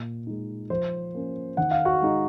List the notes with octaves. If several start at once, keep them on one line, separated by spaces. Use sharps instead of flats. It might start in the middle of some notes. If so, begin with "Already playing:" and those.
Already playing: A#2
G#3 D#4
F3 C5
A#3 C#4
D#3 F#5
F5
F#4 F#5
G#3 D#4